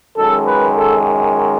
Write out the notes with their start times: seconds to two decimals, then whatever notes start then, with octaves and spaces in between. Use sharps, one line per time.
0.17 F#2 D#3 G#3 A4
0.47 B4
0.76 A4